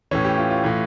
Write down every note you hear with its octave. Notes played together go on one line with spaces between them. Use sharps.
A2 E3 C#4
G4
F4
F4
A2 E3